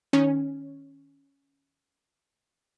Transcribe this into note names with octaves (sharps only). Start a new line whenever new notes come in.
D#3 C#4